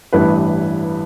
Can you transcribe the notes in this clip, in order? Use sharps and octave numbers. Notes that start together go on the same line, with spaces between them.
A1 G2 E3 B4